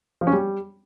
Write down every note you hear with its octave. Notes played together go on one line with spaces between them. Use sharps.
F3
C#4
G3